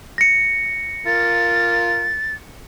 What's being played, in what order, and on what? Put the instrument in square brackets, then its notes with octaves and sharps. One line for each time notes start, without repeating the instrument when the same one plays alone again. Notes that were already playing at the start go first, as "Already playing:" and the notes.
[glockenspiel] A#6 C#7
[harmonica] F4 A#4 [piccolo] A6